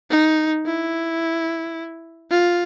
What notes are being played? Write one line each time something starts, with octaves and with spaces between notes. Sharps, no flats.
D#4
E4
F4